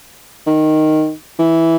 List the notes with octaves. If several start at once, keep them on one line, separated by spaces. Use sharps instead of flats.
D#3
E3